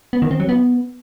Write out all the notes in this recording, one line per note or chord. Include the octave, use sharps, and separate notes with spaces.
B3
D#3
C4
F#3
B3